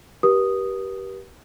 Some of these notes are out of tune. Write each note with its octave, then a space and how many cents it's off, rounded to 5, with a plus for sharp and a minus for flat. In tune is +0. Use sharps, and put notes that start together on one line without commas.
G4 -20 B4 -45 D#6 -5